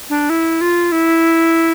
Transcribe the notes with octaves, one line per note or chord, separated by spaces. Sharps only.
D4
E4
F4
E4